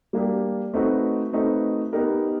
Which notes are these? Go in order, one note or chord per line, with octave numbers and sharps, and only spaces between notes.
G3 A#3 D4 G4
A3 C4 D#4 F#4 B4
A3 C4 D#4 F#4 B4
B3 D#4 G4 A#4